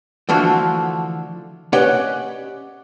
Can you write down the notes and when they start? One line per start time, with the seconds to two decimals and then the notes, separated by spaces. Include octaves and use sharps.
0.29 D3 E3 F3 A3 F4 F#4
1.73 C#4 G4 B4 D5 D#5 F#5